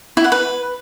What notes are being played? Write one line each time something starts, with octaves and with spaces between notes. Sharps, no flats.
E4
F#5
B4